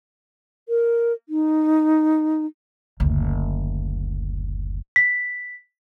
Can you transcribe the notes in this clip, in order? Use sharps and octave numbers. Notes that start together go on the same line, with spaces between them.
A#4
D#4
F#1 D2
B6